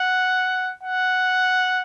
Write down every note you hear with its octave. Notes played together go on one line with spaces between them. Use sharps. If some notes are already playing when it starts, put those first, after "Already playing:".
Already playing: F#5
F#5